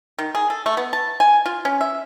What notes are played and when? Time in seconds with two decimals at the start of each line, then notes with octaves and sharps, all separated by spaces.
0.19 D#3
0.35 G#4
0.50 A4
0.66 A3
0.77 B3
0.93 A5
1.20 G#5
1.46 F4
1.65 C#4
1.81 E5